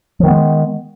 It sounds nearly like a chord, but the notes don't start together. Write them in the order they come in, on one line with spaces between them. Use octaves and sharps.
F3 D#3 B3 G#3